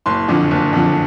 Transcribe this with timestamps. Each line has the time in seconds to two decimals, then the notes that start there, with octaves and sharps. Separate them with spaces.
0.06 F#1 C6
0.28 F2 D3 F3
0.51 F#1
0.73 F2 D3 F3